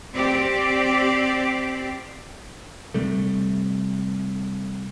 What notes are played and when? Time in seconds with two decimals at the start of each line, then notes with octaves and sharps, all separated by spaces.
0.12 C4 G4 D5
2.94 C3 G3 A3